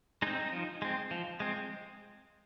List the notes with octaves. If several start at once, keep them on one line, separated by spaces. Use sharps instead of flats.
G#3 C4 D#4
F3
G#3 C4
F3
G#3 C4